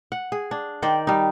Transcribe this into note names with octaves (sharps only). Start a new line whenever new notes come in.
F#5
G#4
D4
D#3 C5 D5 G5
G3 D#4